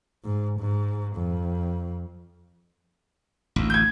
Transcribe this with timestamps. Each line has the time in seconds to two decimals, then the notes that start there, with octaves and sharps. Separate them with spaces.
0.24 G#2
0.60 G#2
1.16 F2
3.56 A1 D2
3.70 G6 G#6